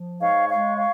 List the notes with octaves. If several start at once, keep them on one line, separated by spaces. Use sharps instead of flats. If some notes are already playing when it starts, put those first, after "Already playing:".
Already playing: F3
G#2 C#5 F5
G#3 C#5 F5
C#5 F5